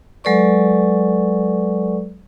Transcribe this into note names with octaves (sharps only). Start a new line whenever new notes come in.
F#3 G#3 A4 B4 D5 C#6